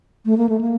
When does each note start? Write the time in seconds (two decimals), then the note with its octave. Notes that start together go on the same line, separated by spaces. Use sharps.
0.26 A3
0.37 A#3
0.49 A3
0.61 A#3